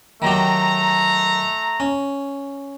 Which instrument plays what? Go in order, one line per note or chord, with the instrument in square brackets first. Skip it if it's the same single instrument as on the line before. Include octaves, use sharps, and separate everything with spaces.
[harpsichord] D#3 F#3 G4 [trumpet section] A3 A#5
[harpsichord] C#4